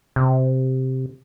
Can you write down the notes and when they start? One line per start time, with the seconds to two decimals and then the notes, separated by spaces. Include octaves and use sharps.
0.16 C3